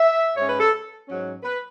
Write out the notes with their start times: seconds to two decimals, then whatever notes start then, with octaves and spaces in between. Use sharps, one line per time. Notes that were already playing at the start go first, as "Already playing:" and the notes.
Already playing: E5
0.37 G#2 G#3 C#4 C#5
0.48 B4
0.60 A4
1.07 G#2 F#3 C#4
1.43 B4